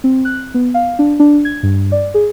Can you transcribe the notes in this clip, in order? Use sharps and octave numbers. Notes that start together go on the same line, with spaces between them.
C4
F#6
B3
F5
D4
D4
G#6
G2
D5
G#4